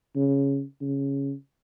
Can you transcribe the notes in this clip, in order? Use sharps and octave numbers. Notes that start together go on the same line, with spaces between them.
C#3
C#3